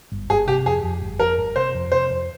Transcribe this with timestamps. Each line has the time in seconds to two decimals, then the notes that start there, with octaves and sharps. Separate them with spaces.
0.12 G1
0.30 G1 G#4
0.47 C3 G4
0.66 F2 G#4
0.83 F2
1.01 G1
1.19 F2 A#4
1.38 G1
1.56 C3 C5
1.74 F2
1.92 C3 C5
2.09 F2